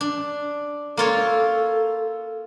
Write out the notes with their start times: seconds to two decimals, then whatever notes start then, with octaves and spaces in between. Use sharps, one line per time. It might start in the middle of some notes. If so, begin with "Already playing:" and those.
0.01 D4
0.97 A#3 F4 A4 C#5